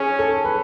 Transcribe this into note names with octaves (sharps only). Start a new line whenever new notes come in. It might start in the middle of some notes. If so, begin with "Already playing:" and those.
Already playing: C#4 G#4
A4
B4